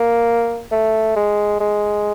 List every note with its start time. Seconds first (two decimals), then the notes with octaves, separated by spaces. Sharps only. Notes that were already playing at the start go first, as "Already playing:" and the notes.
Already playing: A#3
0.72 A3
1.16 G#3
1.60 G#3